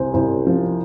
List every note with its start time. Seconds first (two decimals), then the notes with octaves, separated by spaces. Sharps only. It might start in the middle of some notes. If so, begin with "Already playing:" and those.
Already playing: C2 C3 C5 G#5
0.14 C2 C5
0.47 F3